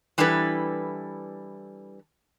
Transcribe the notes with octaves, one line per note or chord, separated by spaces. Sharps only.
E3 G3 D4 E4 A4 B4